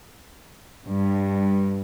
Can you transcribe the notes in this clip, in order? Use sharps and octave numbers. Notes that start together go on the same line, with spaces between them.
G2